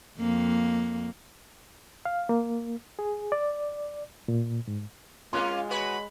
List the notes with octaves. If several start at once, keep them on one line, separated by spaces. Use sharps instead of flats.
F2 A#3
F5
A#3
G#4
D5
A#2
G#2
G#3 A#3 C#4 F4 C6 F#6
F#4 B4 C#5 B5